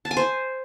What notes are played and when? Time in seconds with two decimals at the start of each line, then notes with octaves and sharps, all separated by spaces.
0.05 A5
0.11 G#5
0.17 C5